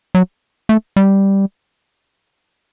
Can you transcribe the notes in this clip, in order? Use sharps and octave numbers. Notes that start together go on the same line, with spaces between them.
F#3
A3
G3